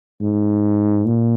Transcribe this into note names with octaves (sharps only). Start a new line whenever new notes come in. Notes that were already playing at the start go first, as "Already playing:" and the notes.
G#2
A#2